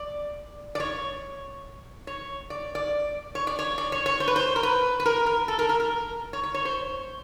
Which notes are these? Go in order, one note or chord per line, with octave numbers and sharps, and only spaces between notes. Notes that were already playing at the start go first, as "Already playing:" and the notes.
Already playing: D5
D5
C#5
C#5
D5
D5
C#5
D5
C#5
D5
C#5
C#5
C5
B4
C5
A#4
B4
B4
A#4
A#4
A4
A#4
A#4
A#4
C#5
C#5
C#5
C5